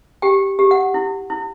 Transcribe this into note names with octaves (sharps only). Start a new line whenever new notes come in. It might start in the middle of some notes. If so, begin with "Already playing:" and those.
G4 G5
G4
F#5
E4
E4